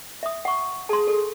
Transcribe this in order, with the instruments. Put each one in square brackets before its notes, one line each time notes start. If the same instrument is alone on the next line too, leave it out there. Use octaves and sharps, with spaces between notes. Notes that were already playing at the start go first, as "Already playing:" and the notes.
[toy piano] E5 D#6
F#5 C#6
[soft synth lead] G#4 [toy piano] A5 C6
[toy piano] A4